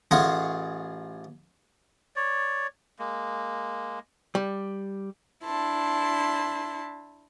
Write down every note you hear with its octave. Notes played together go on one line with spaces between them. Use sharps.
A1 F4 G#4 D#5 F#5 C#6
C#5 D5
G#3 A#3
G3
D4 E4 A5 C6